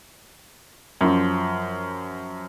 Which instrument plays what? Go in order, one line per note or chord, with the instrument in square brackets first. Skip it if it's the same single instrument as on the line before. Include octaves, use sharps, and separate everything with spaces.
[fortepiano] F#2 F3